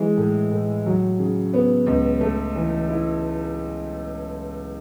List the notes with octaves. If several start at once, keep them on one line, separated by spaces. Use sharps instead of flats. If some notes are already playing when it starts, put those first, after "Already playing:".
Already playing: E3 G#3
A2
A2
F#3
C#3
B3
C#2
A3
E3
E4